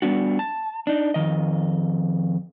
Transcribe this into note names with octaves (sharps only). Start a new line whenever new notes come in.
G3 B3 D4 F#4
A5
D4 D#4
F2 G#2 D#3 D#5